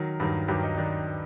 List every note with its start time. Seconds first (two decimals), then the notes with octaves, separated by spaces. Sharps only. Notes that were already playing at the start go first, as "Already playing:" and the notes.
Already playing: D#3 F#3 A#4
0.20 G2 D#3 F#3
0.48 G2 D#3 F#3 G4
0.63 D#4
0.77 D#3 D4